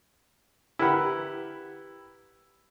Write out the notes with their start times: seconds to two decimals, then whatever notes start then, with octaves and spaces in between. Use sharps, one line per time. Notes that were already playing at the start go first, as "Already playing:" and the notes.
0.79 E4 G4 A#4 B4 F#5 B5